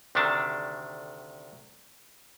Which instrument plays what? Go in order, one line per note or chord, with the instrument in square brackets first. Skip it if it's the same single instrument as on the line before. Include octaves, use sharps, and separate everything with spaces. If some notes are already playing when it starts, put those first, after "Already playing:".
[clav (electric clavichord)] D2 C3 D#3 A3 D4 A5